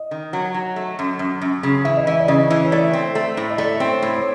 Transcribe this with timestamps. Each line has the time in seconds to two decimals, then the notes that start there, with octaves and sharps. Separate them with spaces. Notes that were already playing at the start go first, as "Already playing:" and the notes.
Already playing: D#5
0.11 D#3
0.33 F#3
0.54 F#3
0.76 A3
0.99 F#2
1.19 F#2
1.41 F#2
1.63 C#3
1.84 E3 E5
1.97 D#5
2.07 E3 E5
2.20 D5
2.28 C#3 D#5
2.50 E3
2.62 C#5
2.72 A3 D5
2.93 C4
3.15 A3
3.37 A2
3.50 D#5
3.58 A3 D5
3.80 C4
3.88 C#5
4.02 A2
4.17 C#5